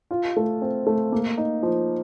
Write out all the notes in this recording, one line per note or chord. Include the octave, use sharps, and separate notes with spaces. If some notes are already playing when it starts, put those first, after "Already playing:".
F4
A3
C4
A3
A#3
D#4
F3